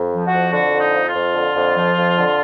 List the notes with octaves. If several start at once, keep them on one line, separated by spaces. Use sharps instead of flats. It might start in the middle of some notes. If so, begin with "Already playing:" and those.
Already playing: F2
F3
F#4
F2
D3 F#4
F2
D#4
F3
F4
F2
D3
F2
F3
F2
D3